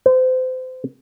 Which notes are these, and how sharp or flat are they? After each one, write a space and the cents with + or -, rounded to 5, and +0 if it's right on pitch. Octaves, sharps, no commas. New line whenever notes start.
C5 -30